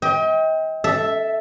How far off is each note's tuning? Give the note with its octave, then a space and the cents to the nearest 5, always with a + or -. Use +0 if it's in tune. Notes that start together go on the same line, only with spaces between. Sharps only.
D#5 +40 G5 +15
A4 +0 E5 +0